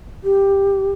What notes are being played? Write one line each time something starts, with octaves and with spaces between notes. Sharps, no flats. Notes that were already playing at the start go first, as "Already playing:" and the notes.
G4